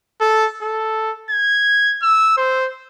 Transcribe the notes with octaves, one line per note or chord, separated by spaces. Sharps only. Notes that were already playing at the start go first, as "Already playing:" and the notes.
A4
A4
G#6
E6
C5